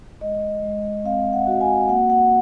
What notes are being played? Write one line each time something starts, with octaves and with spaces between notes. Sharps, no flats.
G#3 D#5
G#3
C4 F5
F#5
F#4
G#5
A#3 F#5
F#5